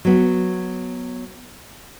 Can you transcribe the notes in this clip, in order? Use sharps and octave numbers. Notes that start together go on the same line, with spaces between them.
F#3 B3